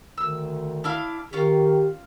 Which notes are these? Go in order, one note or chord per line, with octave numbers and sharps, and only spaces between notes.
D2 D#3 E6
D4 E4 F5
D#3 C#4 F4 G4